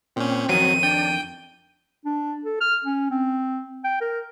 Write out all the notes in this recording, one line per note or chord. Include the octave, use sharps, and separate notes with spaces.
A#2 C4 C#4
F2 D#3 F#3 D#7
D4 G5
D4
A4
F6
C#4
C4
G5
A#4